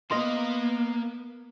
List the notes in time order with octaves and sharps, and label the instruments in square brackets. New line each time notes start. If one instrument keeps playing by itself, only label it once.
[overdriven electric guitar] A#3 F5 [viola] B3 [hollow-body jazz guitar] D#5 C6